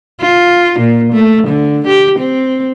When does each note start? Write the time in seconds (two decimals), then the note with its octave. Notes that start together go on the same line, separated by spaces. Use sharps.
0.21 F4
0.79 A#2
1.12 A3
1.47 D3
1.87 G4
2.19 C4